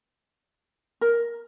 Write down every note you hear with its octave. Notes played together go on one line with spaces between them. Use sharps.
A#4